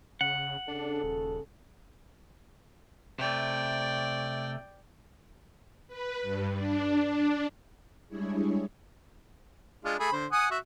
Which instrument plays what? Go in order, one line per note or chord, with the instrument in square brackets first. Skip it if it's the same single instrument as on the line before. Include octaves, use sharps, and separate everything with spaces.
[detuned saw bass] C#3 [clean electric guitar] F#5
[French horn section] C#3 A4 [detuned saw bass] D4
[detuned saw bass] D#1
[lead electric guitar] C3 A3 [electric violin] D5 G5
[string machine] B4
G2
D4
D4
G3 G#3 D4 E4 G#4 C#5
[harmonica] G#3 D4 F4
A3 G#4 B5
D3 C5
F#5 G#5 D#6
F#4 E5